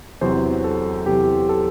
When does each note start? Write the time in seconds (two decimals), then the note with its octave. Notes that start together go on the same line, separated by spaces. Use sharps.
0.21 E2 C3 F#3 C5
0.64 A4
1.06 E2 C3 F#3 G4
1.49 A4